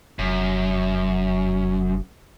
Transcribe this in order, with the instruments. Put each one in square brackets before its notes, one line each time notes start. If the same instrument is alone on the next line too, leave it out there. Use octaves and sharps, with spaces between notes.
[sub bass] F1 [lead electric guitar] F#2